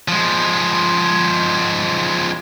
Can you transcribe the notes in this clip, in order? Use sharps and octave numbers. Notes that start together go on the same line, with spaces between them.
F3 G#3